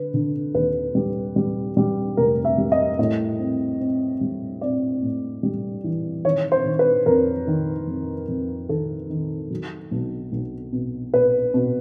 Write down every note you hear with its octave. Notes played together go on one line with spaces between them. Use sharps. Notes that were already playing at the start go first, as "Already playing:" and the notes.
Already playing: D3 B4
D3
D#2 B4
G3
G3
G3
F1 A#4
E5
G3
D#5
A2 D#5
C4
C4
G3
C4 D5
A2
G3
E3
D#3 C#5
C5
D#3
B4
F2 A#4
D#3
F2
F2
D#3 A4
D#3
F#3
B1
B1
B2
B2 B4
B2